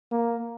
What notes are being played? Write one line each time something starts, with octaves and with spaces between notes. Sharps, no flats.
A#3